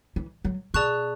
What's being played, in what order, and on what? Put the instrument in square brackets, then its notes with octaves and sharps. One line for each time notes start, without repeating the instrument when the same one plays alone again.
[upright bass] E3
F#3
[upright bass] B2 [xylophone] G#4 D5 A5 C#6 F#6